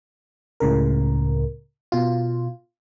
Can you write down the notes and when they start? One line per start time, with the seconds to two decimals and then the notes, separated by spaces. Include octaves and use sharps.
0.60 C#2 A2 C#3 A#4
1.92 B2 F4